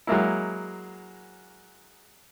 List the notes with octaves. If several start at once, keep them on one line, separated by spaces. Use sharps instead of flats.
F#3 G#3 A#3 E4